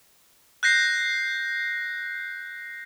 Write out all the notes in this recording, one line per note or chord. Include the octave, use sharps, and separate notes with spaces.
F#6 G6 A#6 C7